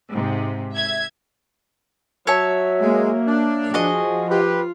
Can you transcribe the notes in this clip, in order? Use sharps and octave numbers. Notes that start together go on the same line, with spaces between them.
G#2 C3
E5 G#6
F#3 C#5 E5 A5
G#3 A#3
D4
F3 F#4 G#4 D#5
F4 G4 B4